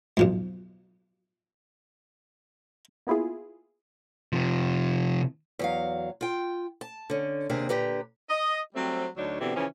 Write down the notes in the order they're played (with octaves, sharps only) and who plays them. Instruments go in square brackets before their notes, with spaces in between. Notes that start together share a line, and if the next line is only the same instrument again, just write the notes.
[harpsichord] B1 F2 G#2
[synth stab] A#3 B3 E4 F4 G#4
[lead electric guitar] C3 F3
[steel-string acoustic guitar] E2 F#3 F5
F4 G5
A5
D3 C#4
D#2 C3 A#3 D4 G#4
A#2 D3 G4 B4 A#5
[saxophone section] D#5
F#3 G3 A3 C4
D2 F#3 D4 D#4 C#5
B2 D3 E3 C4 G4
C#3 E3 F3 C#4